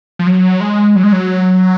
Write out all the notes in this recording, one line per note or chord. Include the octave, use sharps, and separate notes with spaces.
F3
F#3
G#3
F#3
G#3
F#3